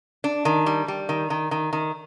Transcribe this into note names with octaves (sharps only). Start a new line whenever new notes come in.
D4
D#3
G3
G3
D#3
D#3
D#3
D#3